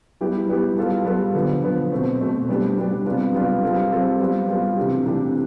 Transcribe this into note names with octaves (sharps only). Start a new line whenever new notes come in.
G3 B3 E4 G4
G3 B3 E4 G4
G3 B3 F4 A4
G3 B3 F4 A4
D3 F3 B3
D3 F3 B3
B2 A3 C4
B2 A3 C4
G3 B3 D4 G4
G3 B3 D4 G4
C3 G3 B3 D4 F4
C3 G3 B3 D4 F4
G3 C4 F4 A4
G3 C4 F4 A4
G3 B3 F4
G3 B3 F4
C3 E3 A3 D4 G4
C3 E3 A3 D4 G4